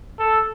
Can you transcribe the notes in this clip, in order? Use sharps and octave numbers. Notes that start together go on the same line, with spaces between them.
A4